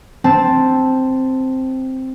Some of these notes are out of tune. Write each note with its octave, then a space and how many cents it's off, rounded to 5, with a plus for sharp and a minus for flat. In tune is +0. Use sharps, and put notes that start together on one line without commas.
C4 +0 A5 +0